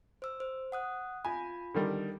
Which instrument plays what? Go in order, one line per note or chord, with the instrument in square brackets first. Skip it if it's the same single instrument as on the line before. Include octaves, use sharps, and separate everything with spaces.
[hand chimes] C5 E6
C5
F#5 D#6 F#6
[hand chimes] F4 B5 [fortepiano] G#5
[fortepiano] D3 D#3 G3